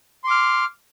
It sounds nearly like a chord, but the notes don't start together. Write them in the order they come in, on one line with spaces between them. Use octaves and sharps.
C6 D6 F6